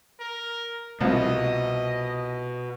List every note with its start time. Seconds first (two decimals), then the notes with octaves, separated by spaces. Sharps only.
0.20 A#4
1.01 C2 B2 F3 D#5 F5